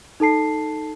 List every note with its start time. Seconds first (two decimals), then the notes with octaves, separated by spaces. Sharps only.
0.20 D#4 A4 A5 C7